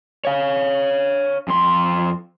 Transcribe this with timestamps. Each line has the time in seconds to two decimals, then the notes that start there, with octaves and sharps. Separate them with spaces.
0.25 C#5 F5
1.48 F2 C6